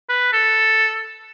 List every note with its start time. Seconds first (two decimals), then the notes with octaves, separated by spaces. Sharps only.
0.09 B4
0.32 A4